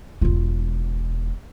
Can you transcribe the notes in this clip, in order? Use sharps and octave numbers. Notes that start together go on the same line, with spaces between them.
E1 F4